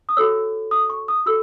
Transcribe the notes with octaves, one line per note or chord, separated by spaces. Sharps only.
D#6
F#4 A4 C#5 E6
D#6
C#6
D#6
F#4 A4 E6